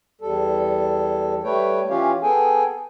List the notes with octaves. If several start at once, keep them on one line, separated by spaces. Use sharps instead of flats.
E2 G3 A4
G3 A3 B4 C#5 G5
E3 C#4 F4 G4 C#5 F5
B3 G#4 A4 G5 G#5